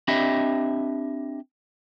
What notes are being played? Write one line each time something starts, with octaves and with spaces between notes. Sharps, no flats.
C4 D4 G4 D#5 E5 B5